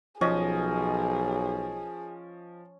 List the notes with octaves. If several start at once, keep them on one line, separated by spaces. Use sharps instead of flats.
B1 F3 C#4 G#4 D#5